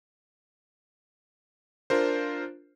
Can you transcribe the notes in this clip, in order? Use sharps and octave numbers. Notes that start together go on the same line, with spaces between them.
D4 F4 A#4 C5